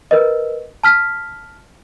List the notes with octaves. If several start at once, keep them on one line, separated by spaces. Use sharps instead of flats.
A#4 B4 D#5
A5 F6 B6